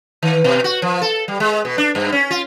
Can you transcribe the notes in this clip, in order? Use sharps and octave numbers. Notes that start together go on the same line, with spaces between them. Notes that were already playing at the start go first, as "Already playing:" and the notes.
D#3
B2
F#4
F3
A4
G3
G#3
B2
D4
G2
C#4
F4